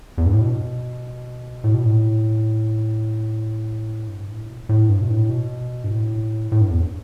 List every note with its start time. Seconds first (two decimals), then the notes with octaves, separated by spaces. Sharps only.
0.18 E2
0.26 G2
0.34 A2
0.41 B2
1.64 A2
1.75 B2
1.85 A2
4.08 G2
4.28 A2
4.48 B2
4.69 A2
4.89 G2
5.01 B2
5.09 A2
5.30 B2
5.84 G2
5.91 A2
6.52 A2
6.61 G2
6.71 E2